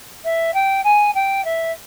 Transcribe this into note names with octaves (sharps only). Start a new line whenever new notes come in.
E5
G5
G#5
G5
E5